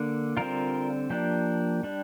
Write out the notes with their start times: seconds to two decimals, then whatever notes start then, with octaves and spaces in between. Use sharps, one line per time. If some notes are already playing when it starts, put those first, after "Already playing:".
Already playing: D3 A#3 D4
0.37 D3 G3 C4 F4 A#4
1.10 F3 A#3 D4 G4
1.83 G3 D4